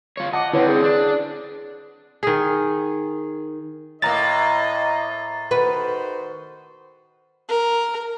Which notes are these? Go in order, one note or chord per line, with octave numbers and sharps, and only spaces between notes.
F4 C#5
D#5 F#5 A5 D6
D3 C4 E4 B4 C#5 F#5
G#4
D4
D#3 G#4
A2 A#3 D#5 A#5 A6
D#3 F#4 B4 C5
A#4